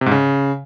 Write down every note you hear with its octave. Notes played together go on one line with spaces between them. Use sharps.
C3
G#2
C#3